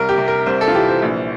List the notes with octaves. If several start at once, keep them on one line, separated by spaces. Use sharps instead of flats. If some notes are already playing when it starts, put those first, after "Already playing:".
Already playing: C2 A#4
G4
C3
A#4
C2 C5
A4
F4
E3 G4
C5
A#1